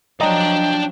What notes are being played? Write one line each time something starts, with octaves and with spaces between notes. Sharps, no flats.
F3 F#3 D4 D5 D#5 G5 A#5